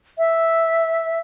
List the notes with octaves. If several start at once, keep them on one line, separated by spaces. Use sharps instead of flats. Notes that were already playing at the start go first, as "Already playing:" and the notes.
E5